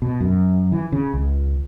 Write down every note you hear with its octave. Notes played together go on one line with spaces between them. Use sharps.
B2
F#2
E3
C#3
C#2